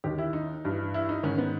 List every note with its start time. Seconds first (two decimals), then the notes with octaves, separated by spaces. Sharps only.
0.04 D#2 D#3 G4
0.18 E4
0.33 D#4
0.64 G2 E3
0.94 E4
1.09 D#4
1.23 G#2 D#3 C#4
1.38 B3